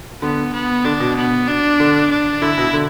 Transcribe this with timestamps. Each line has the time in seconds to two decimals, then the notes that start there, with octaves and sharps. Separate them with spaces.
0.22 D3 B3
0.53 B3
0.85 D3 D4
1.00 B2
1.17 B3
1.48 D4
1.80 D3
2.11 D4
2.42 D3 E4
2.58 B2
2.73 D3